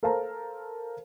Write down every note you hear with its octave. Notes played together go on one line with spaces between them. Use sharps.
A4 A#4 C5 F5 A5 A#5